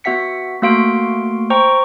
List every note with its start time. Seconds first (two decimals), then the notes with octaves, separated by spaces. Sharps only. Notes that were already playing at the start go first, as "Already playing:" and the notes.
0.04 B3 F#4 E5 F#5 B6 C#7
0.62 A3 A#3 F#4 F5 C6 D7
1.50 C5 G5 A#5 C#6